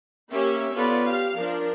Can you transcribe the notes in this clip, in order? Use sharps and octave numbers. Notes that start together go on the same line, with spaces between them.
A#3 C#4 G4 E5
B3 C#4 F4 A4 B4 D5
G4 F5
F3 D4 A#4